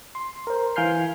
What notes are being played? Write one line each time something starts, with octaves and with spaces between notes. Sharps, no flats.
C6
A#4 C5
E3 F5 G#5 F6 G6 C7